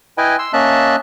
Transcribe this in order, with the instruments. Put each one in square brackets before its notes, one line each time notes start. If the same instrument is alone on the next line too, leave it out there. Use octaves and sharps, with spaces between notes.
[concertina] E4 B4 D#5 G5 G#5
C6 E6
A#3 C#4 D#5 E5 A5 F#6